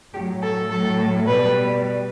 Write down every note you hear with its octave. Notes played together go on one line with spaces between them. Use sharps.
A2 F#3 G4
A4
A2 F#3 A4
B2 G3 B4